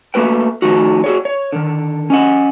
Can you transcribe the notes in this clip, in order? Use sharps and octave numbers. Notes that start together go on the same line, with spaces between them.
A3 A#3 F#4 B4 G5
D#3 F3 A3 D#4 F#4
F#4 G#4 C#5
C#5
D3 D#3
C#4 D#5 F#5